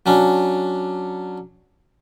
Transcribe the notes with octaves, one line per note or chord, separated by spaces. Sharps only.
F#3 C#4 D4